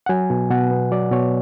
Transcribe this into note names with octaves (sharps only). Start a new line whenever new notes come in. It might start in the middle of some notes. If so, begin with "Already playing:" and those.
F#5
F#3 G#5
B2
B2 F#5
B3
F#3 D5
B2 C#5